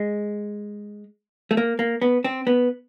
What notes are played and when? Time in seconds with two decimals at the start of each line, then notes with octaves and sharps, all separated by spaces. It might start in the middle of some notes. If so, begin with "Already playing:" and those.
Already playing: G#3
1.51 A3
1.57 A#3
1.79 A#3
2.02 B3
2.24 C4
2.47 B3